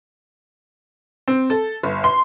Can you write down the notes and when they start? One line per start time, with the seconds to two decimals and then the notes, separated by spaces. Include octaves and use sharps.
1.28 C4
1.50 A4
1.83 G1
2.04 C6